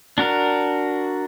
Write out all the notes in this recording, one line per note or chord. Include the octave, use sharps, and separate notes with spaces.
D4 F#4 A#4